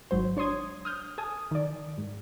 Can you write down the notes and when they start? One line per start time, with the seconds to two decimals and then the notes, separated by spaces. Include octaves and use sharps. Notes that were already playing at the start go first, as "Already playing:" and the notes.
0.11 G#1 F#3 C5
0.37 D4 C#5 C6 D#6 G#6
0.85 D#6 F6 G6
1.18 A4 G#5 D#6
1.51 D#3 D5
1.98 G#2